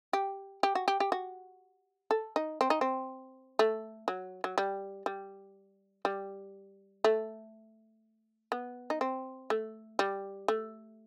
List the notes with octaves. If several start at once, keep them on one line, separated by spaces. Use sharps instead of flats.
G4
G4
F#4
G4
G4
F#4
A4
D#4
C4
D#4
C4
A3
F#3
F#3
G3
G3
G3
A3
B3
D#4
C4
A3
G3
A3